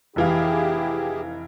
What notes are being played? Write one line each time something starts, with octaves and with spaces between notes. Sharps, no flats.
F1 E3 E4 G4 G#4 F5